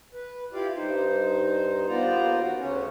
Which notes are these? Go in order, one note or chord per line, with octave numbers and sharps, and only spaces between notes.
B4
E4 F4 G4 D5 F5
G2 D#4 C5
D#2 B3 F4 C5 D5 A#5
F#4
D2 C#3 C#4 C#5